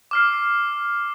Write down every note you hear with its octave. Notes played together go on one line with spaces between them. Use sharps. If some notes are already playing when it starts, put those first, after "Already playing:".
D6 F6 C7